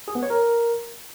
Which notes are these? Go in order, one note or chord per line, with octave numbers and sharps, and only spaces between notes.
G#4
B3
C#5
A#4